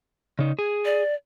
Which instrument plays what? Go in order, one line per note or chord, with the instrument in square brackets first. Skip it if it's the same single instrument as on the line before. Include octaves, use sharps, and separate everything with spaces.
[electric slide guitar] C#3 D#4
G#4
[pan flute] D5